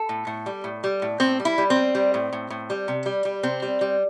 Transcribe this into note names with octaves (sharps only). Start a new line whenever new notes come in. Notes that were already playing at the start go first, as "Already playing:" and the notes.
Already playing: A4
A2
A2
G3
A2
G3
A2
A2 C4
G3
E4
G3
C4
G3
G3
A2
A2
A2
G3
C3
G3
G3
C3 C4
G3
G3